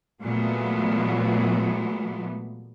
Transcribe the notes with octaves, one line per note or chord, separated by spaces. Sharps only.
A#2 E3 F#3 G#3 A3 B3